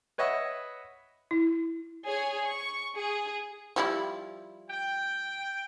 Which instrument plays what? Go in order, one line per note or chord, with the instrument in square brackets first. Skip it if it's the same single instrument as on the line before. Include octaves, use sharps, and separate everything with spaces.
[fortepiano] B4 C#5 D#5 E5 F#5
[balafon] E4
[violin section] G#4 C#5
C#6
G#4
[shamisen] F3 G3 E4
[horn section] G5